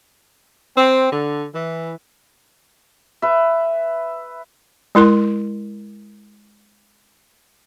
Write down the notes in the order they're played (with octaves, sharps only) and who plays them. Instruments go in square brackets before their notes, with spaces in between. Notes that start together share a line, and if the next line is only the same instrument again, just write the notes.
[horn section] C4
D3
E3
[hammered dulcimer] B4 E5
[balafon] G#3 E4 A#4 C6